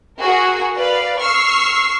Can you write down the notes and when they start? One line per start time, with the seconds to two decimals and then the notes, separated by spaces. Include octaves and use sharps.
0.20 F#4 G#4 A#4
0.75 B4 D5 F5
1.20 C#6 E6 F6 C7